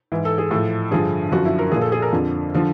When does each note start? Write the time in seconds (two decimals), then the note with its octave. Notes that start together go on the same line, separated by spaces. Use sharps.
0.12 G#2 E3
0.25 A4
0.38 G#4
0.51 A2 F3 A4
0.91 G2 D3 F3 G#4
1.32 F#2 D3 F3 F#4
1.45 E4
1.59 A#4
1.71 A#2 F3 G#4
1.81 A4
1.92 G#4
2.02 A#4
2.12 F2 D3 F3
2.54 D3 F3